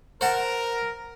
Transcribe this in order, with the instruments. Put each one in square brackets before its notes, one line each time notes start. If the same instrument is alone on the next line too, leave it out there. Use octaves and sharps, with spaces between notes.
[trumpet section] A#4 [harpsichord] C5 F#5 A5